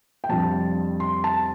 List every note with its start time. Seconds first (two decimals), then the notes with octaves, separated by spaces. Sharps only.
0.24 G5
0.29 F2 C3 G3 D4 F4 A5
1.00 C6
1.24 A5